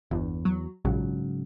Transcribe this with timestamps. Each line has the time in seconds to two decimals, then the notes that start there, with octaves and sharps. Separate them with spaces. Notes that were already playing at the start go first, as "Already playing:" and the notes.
0.11 G1 E2
0.45 F#3
0.85 A#1 G#2 C#3 F#3